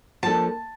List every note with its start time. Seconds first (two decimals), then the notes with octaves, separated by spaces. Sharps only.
0.23 F3 A#3 D4 A4 A5